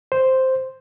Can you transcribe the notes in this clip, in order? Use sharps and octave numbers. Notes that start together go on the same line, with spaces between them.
C5